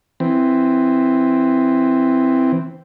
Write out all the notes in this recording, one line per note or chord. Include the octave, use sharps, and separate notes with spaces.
E3 C4